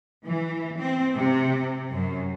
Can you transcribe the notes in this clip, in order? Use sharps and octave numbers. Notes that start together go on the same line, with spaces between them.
E3
C4
C3
F#2